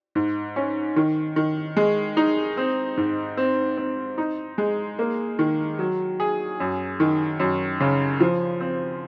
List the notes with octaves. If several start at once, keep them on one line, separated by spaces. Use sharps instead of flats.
G#2
C#4
D#3
D#3
G#3
D#4
C4
G#2
C4
C4
D#4
G#3
A#3
D#3
F#3
G#4
F#2
D#3
F#2
C#3
F3
C4